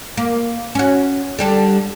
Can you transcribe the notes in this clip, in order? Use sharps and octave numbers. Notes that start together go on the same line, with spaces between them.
A#3
C#4 F#4
D3 G3 A4